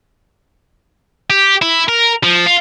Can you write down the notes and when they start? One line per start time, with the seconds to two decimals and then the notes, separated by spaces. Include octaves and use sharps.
1.30 G4
1.62 E4
1.89 A#4
2.23 F3
2.46 F4